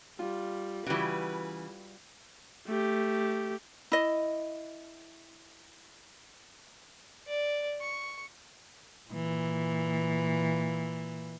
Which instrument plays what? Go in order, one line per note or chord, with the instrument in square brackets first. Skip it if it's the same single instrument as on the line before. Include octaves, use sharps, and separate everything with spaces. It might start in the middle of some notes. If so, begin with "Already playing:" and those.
[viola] G3 [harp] F4
[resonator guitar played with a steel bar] C#3 E3 [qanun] G3 F#4 [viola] B4
[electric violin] A3 G4
[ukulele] E4 D#5
[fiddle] D5
C#6
[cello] A#2 E3